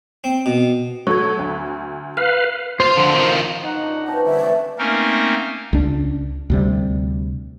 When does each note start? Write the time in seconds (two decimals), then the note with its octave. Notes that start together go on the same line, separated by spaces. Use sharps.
0.24 C4
0.46 B2
1.07 F#3 A3 C#6 G#6
1.39 D2
2.17 B4 F5 F6
2.80 F4 C5 F5
2.96 F2 D3
3.14 D#3 F3
3.63 D#4 F4 F#4 F#5
3.81 F#2 D4
4.07 E3 C4 C#4 D#4 A5
4.25 A#2 D3 G3 D5 E5 F5
4.40 G2 E3 A3 D4 B4 F5
4.78 A3 A#3 C4 C#4 D#4 A#4
5.73 C#2 D4
6.50 D2 C3 G3